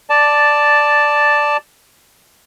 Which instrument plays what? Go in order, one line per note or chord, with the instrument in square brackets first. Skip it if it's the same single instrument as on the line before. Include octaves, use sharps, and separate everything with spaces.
[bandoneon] D5 A5